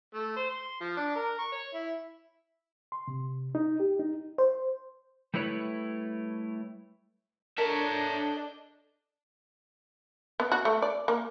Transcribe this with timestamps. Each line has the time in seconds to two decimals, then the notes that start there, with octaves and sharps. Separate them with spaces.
0.14 A3
0.36 C5
0.49 C6
0.81 F3
0.97 D4
1.16 A#4
1.39 C#6
1.52 C#5
1.74 E4
2.92 C6
3.08 C3
3.55 D#4
3.80 G4
3.99 D#4
4.38 C5
5.34 G3 A3 E4 B4 C#5
7.58 D4 A4 A#4 C#5 D#5 E5 G6
10.40 B3
10.52 F#4
10.65 A3
10.82 D5
11.08 A#3